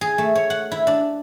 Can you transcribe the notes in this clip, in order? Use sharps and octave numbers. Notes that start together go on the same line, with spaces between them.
G#4
A3
C#5
F#5
E4
D4